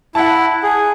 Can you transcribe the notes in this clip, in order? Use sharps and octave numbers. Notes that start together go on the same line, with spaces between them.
E4 F#5 A5
G#4